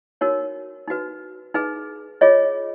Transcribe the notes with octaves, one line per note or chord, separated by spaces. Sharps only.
D#4 F#4 A#4 C#5
D#4 F#4 B4
D#4 G#4 B4
F4 G#4 C#5 D#5